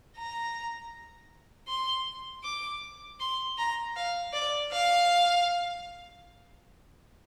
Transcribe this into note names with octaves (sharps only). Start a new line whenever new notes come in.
A#5
C6
D6
C6
A#5
F5
D5
F5